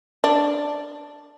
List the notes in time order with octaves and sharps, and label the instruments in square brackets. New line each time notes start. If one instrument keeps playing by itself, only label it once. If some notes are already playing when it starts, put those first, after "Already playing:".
[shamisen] D4